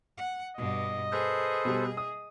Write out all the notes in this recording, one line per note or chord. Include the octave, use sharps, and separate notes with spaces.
F#5
G2 B2 D#5
G#4 A4 B4 C5
B2 G3
D#6